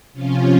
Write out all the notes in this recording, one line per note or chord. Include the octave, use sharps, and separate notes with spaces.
C3 F3 C#4 F4